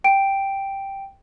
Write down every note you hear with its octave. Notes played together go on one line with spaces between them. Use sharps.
G5 D7